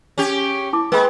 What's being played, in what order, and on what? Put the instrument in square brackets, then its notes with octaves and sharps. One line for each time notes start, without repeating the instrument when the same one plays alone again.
[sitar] C#4 G4
[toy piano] E4 A5 D6
[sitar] G#3 [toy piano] B4 G5 B5